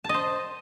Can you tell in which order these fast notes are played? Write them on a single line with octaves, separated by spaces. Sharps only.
A5 D#5 C5